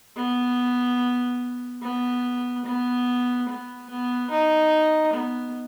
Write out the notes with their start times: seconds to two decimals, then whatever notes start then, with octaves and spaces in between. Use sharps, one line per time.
0.16 B3
1.82 B3
2.65 B3
3.49 B3
3.90 B3
4.31 D#4
5.13 B3